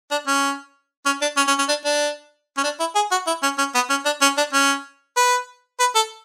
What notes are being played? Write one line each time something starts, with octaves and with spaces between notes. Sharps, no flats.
D4
C#4
C#4
D4
C#4
C#4
C#4
D4
D4
C#4
D4
E4
G#4
F#4
E4
C#4
C#4
B3
C#4
D4
C#4
D4
C#4
B4
B4
A4